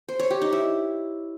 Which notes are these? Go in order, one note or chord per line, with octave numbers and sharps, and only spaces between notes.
C5
C#5
G4
D#4
E4